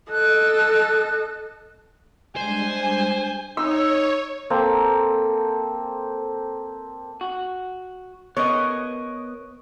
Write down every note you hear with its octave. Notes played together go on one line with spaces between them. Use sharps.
A4 D#5 F#6
G3 G#3 D4 C5 G#5
D#4 C#5 E6
A#3 C4 A4
F#4
B3 A#4 C#5 D#5